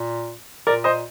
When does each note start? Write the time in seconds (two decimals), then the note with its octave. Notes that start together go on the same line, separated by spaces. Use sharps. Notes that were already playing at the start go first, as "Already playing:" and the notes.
Already playing: A#2
0.66 A#2 A#4 D5
0.84 C5 D#5